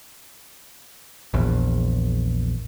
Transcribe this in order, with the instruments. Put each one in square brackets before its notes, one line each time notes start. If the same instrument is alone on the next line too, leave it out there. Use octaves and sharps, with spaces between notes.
[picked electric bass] A#1 E2